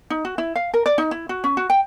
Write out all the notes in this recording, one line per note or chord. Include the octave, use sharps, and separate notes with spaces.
D#4
F#4
E4
F5
A#4
D5
D#4
E4
F#4
C#4
F#4
G5